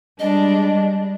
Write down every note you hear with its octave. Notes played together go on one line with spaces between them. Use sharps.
G3 G#3 D4 D#5